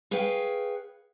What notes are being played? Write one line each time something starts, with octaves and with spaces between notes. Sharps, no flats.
G#4 B4 C#5 F5 G5